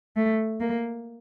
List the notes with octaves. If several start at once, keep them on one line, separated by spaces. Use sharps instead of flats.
A3
A#3